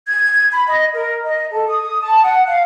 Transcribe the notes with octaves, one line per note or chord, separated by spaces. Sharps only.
G#6
B5
D#5
A#4
D#5
A4
D#6
A5
F#5
F5